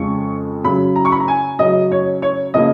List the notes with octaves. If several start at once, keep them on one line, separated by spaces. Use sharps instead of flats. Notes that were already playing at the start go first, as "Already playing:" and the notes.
Already playing: F2 C#3 G#3 C#6
C#3 F#3 C#4 B5
A#5
C#6
B5
A#5
G#5
C#3 F#3 C#4 D#5
C#5
C#5
C#3 F3 A#3 D#5